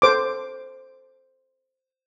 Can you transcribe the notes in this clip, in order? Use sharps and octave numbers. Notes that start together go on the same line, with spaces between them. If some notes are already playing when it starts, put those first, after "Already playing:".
A4 C5 D6